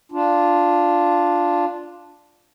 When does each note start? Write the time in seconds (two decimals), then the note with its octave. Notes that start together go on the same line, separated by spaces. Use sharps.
0.12 D4 F4